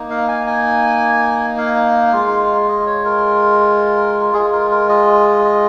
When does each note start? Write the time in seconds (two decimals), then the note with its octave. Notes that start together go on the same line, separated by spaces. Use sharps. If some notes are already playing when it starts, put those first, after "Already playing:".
Already playing: A#3 D#4
0.10 F5
0.28 G#5
0.47 G#5
1.58 F5
2.13 G#3 F4
2.68 D#5
2.87 C#5
3.05 A#4
4.34 G#3 F4 G#4
4.52 A#4
4.71 A#4
4.89 D#5
5.45 D#5